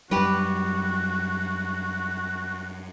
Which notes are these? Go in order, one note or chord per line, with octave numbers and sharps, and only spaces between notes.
F#2 G3 F#4 G4 B4